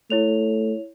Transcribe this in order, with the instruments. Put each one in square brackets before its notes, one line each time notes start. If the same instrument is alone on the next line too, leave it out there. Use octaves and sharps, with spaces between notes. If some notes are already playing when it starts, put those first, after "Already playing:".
[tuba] A3 [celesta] E4 C#5 F7